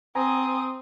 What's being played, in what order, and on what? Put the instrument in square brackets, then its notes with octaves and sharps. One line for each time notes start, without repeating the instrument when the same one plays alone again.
[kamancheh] C4 D#6 [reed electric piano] G#5 A#5